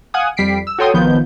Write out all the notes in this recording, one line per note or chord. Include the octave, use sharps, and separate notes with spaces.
F5 F#5 G#5 D#6
F2 G3 B6 C7 D7
E6
F#4 A4 C#5 G5 C6 D#6
G#1 D#3 F3 B3 G6